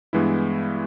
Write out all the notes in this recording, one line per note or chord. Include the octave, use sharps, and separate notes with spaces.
G2 E3 G#3 B3 E4